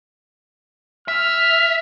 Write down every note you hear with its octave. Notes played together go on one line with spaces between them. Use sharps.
E5 F6